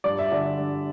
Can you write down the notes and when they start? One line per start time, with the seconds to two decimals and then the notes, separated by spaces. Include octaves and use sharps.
0.04 G2 D5
0.19 E5
0.31 D3 D5
0.59 G2